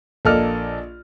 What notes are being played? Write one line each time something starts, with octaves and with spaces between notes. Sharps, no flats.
A#1 A#3 A4 D5 D#5 F6